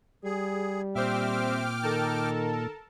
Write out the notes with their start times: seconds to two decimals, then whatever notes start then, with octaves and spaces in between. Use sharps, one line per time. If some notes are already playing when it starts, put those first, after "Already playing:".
0.24 G3 G#4
0.95 A#2 C4 C5 E5 G5 D6 F6
1.83 D#3 A4 A#4 A5